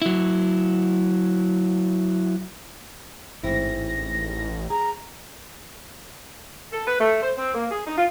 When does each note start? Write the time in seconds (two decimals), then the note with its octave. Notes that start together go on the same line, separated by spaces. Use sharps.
0.02 F#3 E4
3.44 A1 G#2 C4 E4 A#6
4.70 G#4 A#5
6.72 A4
6.86 B4
6.99 A3
7.22 C5
7.36 C4
7.53 A#3
7.70 G#4
7.85 D#4
7.97 F4